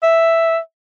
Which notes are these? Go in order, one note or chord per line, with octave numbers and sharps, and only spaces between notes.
E5